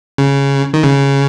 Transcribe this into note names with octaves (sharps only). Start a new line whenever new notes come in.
C#3
D#3
C#3